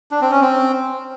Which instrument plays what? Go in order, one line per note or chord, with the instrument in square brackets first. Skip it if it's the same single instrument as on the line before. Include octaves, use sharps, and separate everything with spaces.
[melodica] D4
C4
C#4
C4